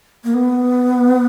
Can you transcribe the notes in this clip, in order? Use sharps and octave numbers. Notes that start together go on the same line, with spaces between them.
A#3
B3